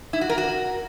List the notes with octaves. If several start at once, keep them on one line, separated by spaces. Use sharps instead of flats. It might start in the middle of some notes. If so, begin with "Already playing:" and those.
E4
F#4
A#4
F#4